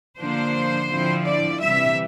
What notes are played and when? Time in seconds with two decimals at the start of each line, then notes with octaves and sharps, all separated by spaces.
0.19 D3 F3 A#3 D4 C5
0.90 D3 F3 C4 E4
1.26 D5
1.60 C3 E3 G3 E5